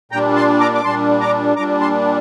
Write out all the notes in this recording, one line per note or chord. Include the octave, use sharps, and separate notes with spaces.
A#2 G3 D4 G5 A#5
A5 C6
A#5 D6
D6
A#2 G3 D4 A5 C6
A#5 D6
A#2 G3 D4 A#5 D6
A5 C6